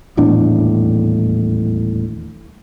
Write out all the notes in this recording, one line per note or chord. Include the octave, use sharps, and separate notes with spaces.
D#1 E2 A2 D4